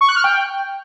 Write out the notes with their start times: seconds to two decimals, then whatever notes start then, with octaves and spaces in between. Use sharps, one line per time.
0.01 C#6
0.09 F#6
0.16 F6
0.24 G5